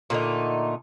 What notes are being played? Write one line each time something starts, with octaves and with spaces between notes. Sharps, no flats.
A#2 D3 A3 D#4